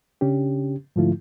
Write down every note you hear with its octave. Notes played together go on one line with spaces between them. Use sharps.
C#3 C#4 D4 G4
G#2 D3 F3 A3 E4 F4